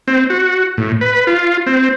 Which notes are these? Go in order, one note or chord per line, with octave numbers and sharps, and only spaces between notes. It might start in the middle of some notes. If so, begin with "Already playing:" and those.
C4
F#4
A2
B4
F4
C4